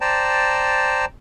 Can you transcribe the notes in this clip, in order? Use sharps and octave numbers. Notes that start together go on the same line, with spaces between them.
C5 D5 G5 A5 A#5